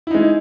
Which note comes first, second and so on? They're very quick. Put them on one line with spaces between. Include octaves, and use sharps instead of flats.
E4 D#4 G#3